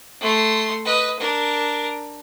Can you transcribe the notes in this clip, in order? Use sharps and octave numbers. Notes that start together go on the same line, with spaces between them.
A3 C6
B4 D#5
D4 A#4